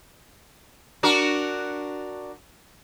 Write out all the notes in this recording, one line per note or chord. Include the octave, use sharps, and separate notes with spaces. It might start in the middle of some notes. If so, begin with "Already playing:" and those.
D4 F#4 A#4